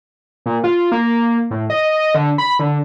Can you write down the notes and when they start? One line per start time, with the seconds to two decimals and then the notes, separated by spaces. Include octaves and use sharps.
0.46 A#2
0.64 F4
0.92 A#3
1.51 A2
1.70 D#5
2.15 D3
2.38 B5
2.59 D3